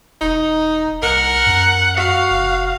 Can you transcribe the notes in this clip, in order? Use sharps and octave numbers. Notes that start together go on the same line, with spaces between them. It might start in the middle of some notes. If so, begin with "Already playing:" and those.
E1 D#4
C2 A#4 F#5
F#2
F#4 F5
F1